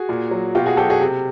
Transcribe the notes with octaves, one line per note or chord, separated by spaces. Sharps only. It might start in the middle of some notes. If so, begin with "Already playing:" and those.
Already playing: F#4 G#4
A#2
F#3
B2 F4 G4
F#4 G#4
F#3 G4 A4
F#4 G#4
C3